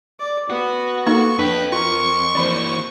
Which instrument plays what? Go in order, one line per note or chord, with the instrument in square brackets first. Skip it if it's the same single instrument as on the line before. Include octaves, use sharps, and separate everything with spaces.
[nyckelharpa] D5
[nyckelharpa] B3 [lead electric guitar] F#4
[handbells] A#3 D#4 A#5 [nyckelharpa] B3 A4 [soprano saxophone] C#6
[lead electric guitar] F2 [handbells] D4 [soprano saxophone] B4 [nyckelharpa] G5
[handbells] F4 [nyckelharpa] A#4 [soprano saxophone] C#6
[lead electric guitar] E3 A#3 [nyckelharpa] C5 [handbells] D5 B5 C#7